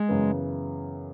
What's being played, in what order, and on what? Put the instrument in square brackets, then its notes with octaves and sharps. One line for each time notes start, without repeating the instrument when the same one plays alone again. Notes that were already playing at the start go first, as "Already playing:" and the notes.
Already playing: [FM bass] G#3
[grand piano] F#2 C#3 E3 B3